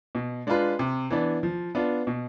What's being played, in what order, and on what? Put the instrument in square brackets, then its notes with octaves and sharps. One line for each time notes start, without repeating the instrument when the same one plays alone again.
[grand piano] B2
G#3 D4 F4 B4
C3
E3 B3 D4
F3
B3 D4 F4
B2